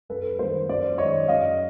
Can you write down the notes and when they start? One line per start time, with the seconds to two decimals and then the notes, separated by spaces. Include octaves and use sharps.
0.09 F#2 A4 B4
0.39 D#3 G3 A#3 A#4 C5
0.69 F#2 C5 D5
0.98 D#3 G#3 C#5 D#5
1.28 F#2 D#5 F5